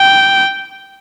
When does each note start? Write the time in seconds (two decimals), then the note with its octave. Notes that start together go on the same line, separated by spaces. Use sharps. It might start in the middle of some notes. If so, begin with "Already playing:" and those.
Already playing: G5